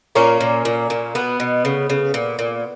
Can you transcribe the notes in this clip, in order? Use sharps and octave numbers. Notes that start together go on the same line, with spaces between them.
A#2 A#3 C#4
A#2
A#2
A#2
B2 B3
B2
C#3
C#3
A#2
A#2